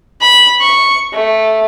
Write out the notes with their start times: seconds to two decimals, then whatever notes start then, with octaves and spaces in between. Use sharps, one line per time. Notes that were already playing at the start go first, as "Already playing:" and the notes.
0.21 B5
0.61 C#6
1.13 A3